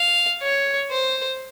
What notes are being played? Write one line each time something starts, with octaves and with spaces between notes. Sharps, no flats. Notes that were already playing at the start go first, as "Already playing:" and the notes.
Already playing: F5
C#5
C5